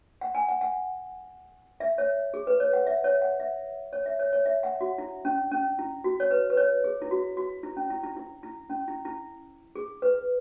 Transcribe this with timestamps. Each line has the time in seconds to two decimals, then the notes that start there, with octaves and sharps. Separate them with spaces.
0.21 F#5
0.35 G#5
0.49 F#5
0.61 F#5
1.80 E5
1.98 C#5
2.34 G#4
2.47 B4
2.60 C#5
2.73 F#5
2.87 E5
3.04 C#5
3.22 F#5
3.40 E5
3.93 C#5
4.06 E5
4.19 C#5
4.33 C#5
4.46 E5
4.63 F#5
4.81 F#4
4.98 E4
5.25 C#4
5.51 C#4
5.79 E4
6.04 F#4
6.20 C#5
6.31 B4
6.50 B4
6.57 C#5
6.84 G#4
7.02 E4
7.11 F#4
7.37 F#4
7.63 E4
7.77 C#4
7.90 E4
8.03 E4
8.17 E4
8.43 E4
8.70 C#4
8.88 E4
9.05 E4
9.76 G#4
10.02 B4